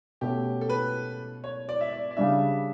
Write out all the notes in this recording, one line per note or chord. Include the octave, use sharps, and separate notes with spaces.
B2 A3 C#4 G4
A4
B4
C#5
D5
E5
D5
D5
C#3 G3 D4 E5